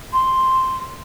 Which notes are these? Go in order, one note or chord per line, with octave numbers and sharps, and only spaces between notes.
C6